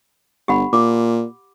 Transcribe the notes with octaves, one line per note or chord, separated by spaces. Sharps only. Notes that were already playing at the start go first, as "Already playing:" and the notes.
G1 G4 F#5 B5
A#2 D6